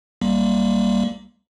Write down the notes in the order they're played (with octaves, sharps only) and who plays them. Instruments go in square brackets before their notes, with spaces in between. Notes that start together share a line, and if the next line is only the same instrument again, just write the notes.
[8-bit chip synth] B1 G3 A#3